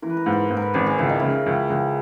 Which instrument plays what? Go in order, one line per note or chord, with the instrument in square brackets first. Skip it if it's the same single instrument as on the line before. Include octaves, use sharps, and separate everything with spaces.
[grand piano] E3 [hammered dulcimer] A#4
[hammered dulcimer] B4
A#4
[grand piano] G#2 [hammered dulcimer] B4
[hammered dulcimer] A#4
[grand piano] G#2
[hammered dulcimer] A#4
B4
[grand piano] G#1 [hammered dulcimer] A#4
[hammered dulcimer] G#4
[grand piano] C#2 [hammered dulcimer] E4
[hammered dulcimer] D#4
[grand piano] C#3 [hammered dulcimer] E4
[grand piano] C#2
C#2